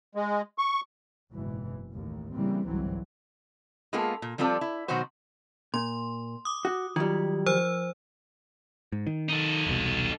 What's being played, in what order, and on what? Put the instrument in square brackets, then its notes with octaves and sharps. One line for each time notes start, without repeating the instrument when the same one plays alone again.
[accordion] G#3
C#6
[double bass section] F#1 G#2 B2 E3
A1 D#2 A2
C#3 E3 G3 A#3 C4
G1 C2 G#2 E3 F#3 C4
[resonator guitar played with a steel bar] G#3 A#3 B3 F4 G#4 A4
A#2
F3 G3 C4 F4 A4 D5
E4
B2 D#3 F#3 F#4 C5
[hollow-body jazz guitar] A#2 [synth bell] C6
[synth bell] D6 D#6
[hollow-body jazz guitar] F#4
[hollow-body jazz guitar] D#3 F#3 G3 [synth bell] F4
[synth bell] F3 C5 E6
[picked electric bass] G#2
D#3
[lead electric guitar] D#4 A4
[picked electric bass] E1 C2 B2